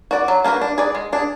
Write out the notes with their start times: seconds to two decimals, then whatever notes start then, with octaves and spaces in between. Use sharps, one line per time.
0.11 F#4 D5
0.28 F#3
0.44 A#3 D4 F#4 B4
0.61 D4
0.78 G#4 B4 D5
0.95 G#3
1.12 D4 G#4